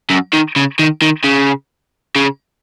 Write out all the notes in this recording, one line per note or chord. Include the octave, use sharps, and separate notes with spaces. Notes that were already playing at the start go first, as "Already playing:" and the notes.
F#2
D#3
C#3
D#3
D#3
C#3
C#3